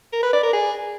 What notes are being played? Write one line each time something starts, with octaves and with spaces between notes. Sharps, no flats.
A#4
B4
D5
A#4
G#4